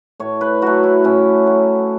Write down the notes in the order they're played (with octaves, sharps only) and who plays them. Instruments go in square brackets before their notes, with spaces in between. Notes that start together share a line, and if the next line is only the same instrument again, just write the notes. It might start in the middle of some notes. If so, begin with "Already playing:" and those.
[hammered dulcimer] A2 C#5
B4
F#3 A3 F#4
E4
A2 C#4
F#3 A3